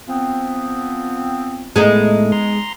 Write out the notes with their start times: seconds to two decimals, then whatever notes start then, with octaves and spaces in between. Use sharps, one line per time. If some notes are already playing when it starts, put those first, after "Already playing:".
0.07 F3 B3 C4
1.76 A2 G#3 A3 B3 D#4
2.32 A#5 C6